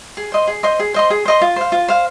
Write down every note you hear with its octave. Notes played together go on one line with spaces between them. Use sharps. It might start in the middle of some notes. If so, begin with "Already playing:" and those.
G#4
C5 D#5 C6
G#4
C5 D#5 C6
G#4
C5 D#5 C6
G#4
C5 D#5 C6
F4
C5 F5
F4
C5 F5